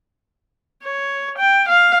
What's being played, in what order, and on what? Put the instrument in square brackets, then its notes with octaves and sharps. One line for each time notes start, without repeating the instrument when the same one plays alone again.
[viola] C#5
G5
F5